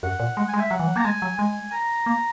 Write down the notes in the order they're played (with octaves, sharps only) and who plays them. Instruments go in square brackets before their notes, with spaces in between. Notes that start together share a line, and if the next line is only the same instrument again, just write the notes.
[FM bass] F#2 [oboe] F#5
[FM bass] A#2
[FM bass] G#3 [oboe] F#5
[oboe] G#5
[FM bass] G#3
[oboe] E5
[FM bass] F#3 [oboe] F#5
[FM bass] E3
F#3
[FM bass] A#3 [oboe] A#5
[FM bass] G#3 [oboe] G#5
[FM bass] F#3
[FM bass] G#3 [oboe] G#5
[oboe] A#5
[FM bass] A#3